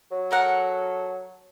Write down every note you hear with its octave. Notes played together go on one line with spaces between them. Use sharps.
F#3
A4 A#4 F#5